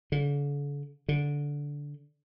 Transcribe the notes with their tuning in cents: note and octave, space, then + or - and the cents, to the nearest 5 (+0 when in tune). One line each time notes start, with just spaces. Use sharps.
D3 -45
D3 -15